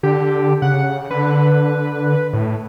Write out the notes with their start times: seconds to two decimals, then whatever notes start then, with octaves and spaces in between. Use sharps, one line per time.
0.03 D3 G4
0.62 C#3 F#5
1.10 D3 B4
2.33 A2